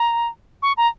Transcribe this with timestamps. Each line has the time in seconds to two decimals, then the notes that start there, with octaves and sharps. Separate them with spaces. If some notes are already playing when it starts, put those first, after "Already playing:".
Already playing: A#5
0.62 C#6
0.77 A#5